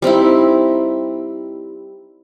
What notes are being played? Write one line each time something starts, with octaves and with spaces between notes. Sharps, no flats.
G3 C4 D#4 E4